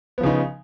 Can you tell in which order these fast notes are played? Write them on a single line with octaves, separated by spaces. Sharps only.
B3 F3 C#3 D#4